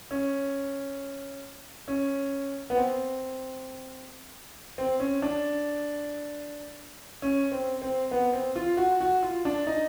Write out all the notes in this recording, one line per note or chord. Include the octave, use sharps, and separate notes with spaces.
C#4
C#4
B3
C4
C4
C#4
D4
C#4
C4
C4
B3
C4
F4
F#4
F#4
F4
D4
D#4